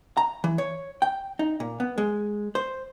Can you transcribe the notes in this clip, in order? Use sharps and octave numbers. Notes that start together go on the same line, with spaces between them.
A#5
E3
C#5
G5
D#4
A#2
B3
G#3
C5